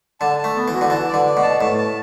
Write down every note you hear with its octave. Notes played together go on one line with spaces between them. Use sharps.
D3 A5
A5
A3
B3
E3
F#4
D3
E3 A5
D5
D3
D5
B2
A5
A2 A5
A5